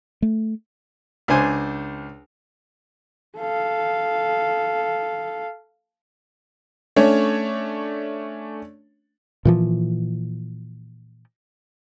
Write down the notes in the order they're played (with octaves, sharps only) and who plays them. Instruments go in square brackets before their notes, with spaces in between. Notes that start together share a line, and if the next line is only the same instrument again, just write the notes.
[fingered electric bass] A3
[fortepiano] C#2 D4 C5 G#5
[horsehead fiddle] A4 F5
[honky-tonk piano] A3 C#4 D4 C#5
[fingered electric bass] A#2 E3 F3